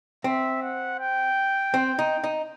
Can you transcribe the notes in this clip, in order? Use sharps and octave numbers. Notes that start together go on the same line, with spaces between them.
C4 E5
F#5
G5
C4
D#4
D#4